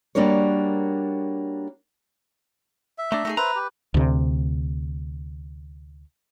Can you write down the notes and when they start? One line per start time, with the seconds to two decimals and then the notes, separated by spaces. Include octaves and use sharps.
0.15 G3 A#3 D4 F#4 A#4 C#5
2.98 E5
3.12 A3 D4 A#5
3.25 A3 D#4 G4 G#4
3.37 B4 C5 E5 A#5
3.56 G4
3.94 D2 C3